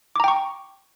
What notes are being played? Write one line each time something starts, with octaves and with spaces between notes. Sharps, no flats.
G5 A#5 C#6 D6